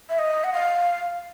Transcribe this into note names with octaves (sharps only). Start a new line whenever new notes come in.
E5
D#5
F#5
F5